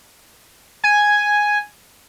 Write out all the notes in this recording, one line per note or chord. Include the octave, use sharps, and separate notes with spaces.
G#5